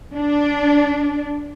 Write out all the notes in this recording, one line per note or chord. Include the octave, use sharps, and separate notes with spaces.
D4